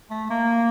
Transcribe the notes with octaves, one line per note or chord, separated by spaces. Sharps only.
A3
A#3